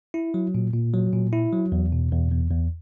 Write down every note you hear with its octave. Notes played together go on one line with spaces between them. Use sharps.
E4
F#3
A#2
A#2
F#3
A#2
E4
F#3
E2
B2
E2
E2
E2